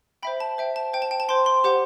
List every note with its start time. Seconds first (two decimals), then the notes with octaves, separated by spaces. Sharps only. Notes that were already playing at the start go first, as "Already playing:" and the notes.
0.23 C5 E5 G5 B5
0.40 A5
0.58 C5 E5 G5
0.76 A5
0.93 C5 G5
1.02 A5
1.11 G5
1.20 A5
1.28 C5 G5 C6
1.46 C6
1.64 G4 C5 F#5